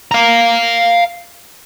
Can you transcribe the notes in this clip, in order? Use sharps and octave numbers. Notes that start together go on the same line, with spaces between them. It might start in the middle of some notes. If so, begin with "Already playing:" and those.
F5 A#5